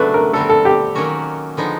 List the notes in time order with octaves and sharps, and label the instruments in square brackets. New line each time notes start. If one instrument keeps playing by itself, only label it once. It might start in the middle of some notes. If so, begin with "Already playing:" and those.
Already playing: [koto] C#3 F#3 A3 D4 [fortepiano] B4
[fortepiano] A#4
[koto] D3 G3 C4 [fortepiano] A4
[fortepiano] A4
G4
[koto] D#3 F#3 A#3 C#4 F#4
D3 F3 G#3 B3 D#4